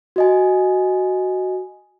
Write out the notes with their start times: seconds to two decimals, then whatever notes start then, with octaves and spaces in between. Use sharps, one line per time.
0.16 F#4 D#5 G#5